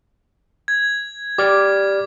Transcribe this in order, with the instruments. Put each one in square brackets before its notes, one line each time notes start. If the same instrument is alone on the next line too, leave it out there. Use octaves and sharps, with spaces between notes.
[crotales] G#6
[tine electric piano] G4 D5 F6 [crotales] D6